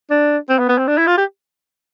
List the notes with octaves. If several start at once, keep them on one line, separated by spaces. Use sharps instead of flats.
D4
C4
B3
B3
C4
D4
E4
F4
G4